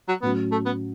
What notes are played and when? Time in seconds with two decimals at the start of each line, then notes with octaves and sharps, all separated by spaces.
0.08 F#3
0.22 A2 F#3 B3 C#4 F#4
0.51 A3
0.66 B3